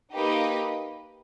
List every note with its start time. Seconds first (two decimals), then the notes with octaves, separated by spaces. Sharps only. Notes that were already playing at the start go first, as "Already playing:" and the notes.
0.12 A#3 D#4 G4 B4 D#5